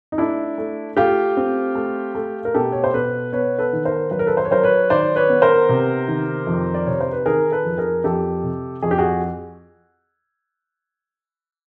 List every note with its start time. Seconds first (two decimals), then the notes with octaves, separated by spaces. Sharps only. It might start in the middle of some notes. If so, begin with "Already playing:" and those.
0.12 D#4
0.18 A3 D4 E4
0.58 A3
0.97 A3 F4 G4
1.37 C4
1.75 A3
2.15 A3
2.45 A#4
2.54 B2 G4 A4
2.72 C#5
2.84 C5
2.94 B2 A4 B4
3.32 B3 B4 C#5
3.59 A4 B4
3.73 D#3
3.85 A#4 C5
4.11 F#3 B4
4.19 A#4
4.26 A4 B4
4.37 C5
4.45 C#5
4.51 F#3 A#4 C5
4.63 B4 C#5
4.90 D#3 C5 D5
5.16 B4 C#5
5.29 B3
5.42 A#4 C5
5.69 C3
6.08 D#3
6.47 F2
6.74 D5
6.87 C3 C#5
7.01 C5
7.12 B4
7.25 D#3 G#4 A#4
7.52 A4 B4
7.65 F2
7.78 G#4 A#4
8.04 F2 G4 A4
8.43 C3
8.82 F2 G#4
8.91 G4
8.98 F#4 G#4